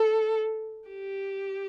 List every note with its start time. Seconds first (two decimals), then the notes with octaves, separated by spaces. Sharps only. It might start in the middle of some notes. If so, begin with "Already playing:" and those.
Already playing: A4
0.89 G4